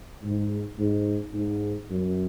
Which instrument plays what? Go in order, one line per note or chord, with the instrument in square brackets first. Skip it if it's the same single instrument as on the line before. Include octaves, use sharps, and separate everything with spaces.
[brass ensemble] G#2
G#2
G#2
F#2